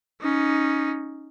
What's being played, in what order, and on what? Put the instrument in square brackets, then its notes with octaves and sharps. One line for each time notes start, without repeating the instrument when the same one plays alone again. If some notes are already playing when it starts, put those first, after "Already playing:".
[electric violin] C#4 D#4